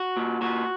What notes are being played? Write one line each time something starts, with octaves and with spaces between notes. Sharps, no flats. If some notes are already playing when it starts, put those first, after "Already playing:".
Already playing: F#4
A#2
A#2 F#4